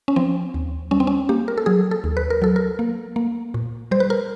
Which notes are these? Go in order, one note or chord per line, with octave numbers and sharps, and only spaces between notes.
C#4
F3 C4
D#2
G3 C#4
C4
C#4
A#3 G4
A#4
A4
F#3 G#4
A4
D#2
B4
A#4
F#3 A4
A#4
A#3
A#3
A#2
G3 C5
B4
A#4